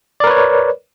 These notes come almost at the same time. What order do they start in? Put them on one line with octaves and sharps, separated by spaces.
D5 A#4 B4 C#5